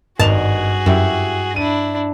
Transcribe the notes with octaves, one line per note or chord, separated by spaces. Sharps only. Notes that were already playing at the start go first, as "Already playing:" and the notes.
G#1 G2 D#4 F#4 G#4 A5 F7
F#2 E4 G4 E5
D4 E4 D#7